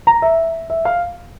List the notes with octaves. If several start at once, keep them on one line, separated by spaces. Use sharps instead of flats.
A#5
E5
E5
F5